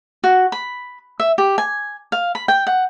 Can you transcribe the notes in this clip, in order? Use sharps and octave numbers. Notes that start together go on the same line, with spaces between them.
F#4
B5
E5
G4
G#5
F5
B5
G5
F#5